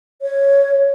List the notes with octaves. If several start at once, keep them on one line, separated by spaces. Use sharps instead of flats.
C#5